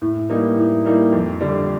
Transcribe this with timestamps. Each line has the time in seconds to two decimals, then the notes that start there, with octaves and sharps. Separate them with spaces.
0.02 A2
0.29 E3 G3 A#3 D#4
0.57 A2
0.85 E3 G3 A#3 D#4
1.12 F2
1.41 D3 G3